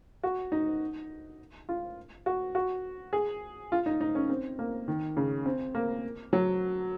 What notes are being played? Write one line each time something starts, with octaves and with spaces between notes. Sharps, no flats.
F#4
D#4
F4
F#4
F#4
G#4
F4
D#4
D#4
C#4
C4
A#3
D#3
C#3
C4
A#3
F#3